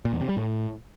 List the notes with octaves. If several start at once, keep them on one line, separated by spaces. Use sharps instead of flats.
A#2
E2
C3
G3
A2